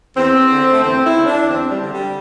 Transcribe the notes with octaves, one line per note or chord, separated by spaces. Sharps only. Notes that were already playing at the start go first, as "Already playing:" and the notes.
E2 C4
D3
A3
E2 C4
E4
D3
D4
E2 C4
G3
D3
G3